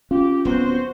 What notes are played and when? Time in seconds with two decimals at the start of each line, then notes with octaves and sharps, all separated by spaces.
0.11 C#4 F4 G4
0.45 D1 B3 C4 F#4 C5